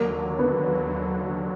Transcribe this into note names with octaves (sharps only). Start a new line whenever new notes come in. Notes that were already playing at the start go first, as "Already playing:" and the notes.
Already playing: D#2 D3 F#3 A#3
B3